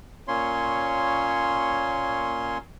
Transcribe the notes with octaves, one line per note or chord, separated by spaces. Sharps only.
A#2 A#3 C#4 C#5 C6